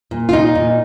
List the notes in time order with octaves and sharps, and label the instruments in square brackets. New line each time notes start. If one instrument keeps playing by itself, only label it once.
[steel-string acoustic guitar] A#2
F4
A#2 D#4
A#2